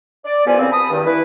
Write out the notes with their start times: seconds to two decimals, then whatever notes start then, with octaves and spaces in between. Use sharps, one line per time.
0.25 D5
0.46 C2 G2 F3 G3 B3 G#5
0.58 C#3 E3 G3 A#3 C4
0.71 A5 B5 D#6
0.90 E2 G2 D#3
1.06 E3 G3 E4 B4